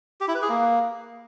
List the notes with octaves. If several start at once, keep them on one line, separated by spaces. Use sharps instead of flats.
G4
E4
B4
G#4
A#3